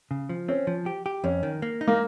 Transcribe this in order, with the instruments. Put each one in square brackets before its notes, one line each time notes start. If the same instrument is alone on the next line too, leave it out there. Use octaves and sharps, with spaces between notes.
[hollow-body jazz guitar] C#3
F3
[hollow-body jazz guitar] C4 [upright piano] C#4
[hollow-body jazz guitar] F3
G4
G4
[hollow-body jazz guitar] F2 [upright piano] C#4
[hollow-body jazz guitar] D#3
A#3
D#4
[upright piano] A#3